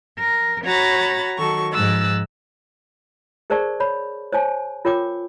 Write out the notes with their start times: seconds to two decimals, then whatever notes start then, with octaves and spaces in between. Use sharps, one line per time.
0.19 A#4
0.64 F#4 C#5 A#5 B5 A6
1.38 D#3 F#3 A4 C#6
1.73 G#2 F3 E6 F#6 A6
3.50 G#4 A#4 C5 D5 A5 C#6
3.80 C#5 B5
4.32 C5 C#5 G#5 A5
4.85 F4 A#4 C#5 G5 D6